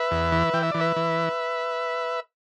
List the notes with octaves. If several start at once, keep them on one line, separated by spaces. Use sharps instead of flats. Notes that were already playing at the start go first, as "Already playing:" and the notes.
Already playing: B4 E5
E2
E3
E3 G5
E5
E3 D5
B4 E5
E3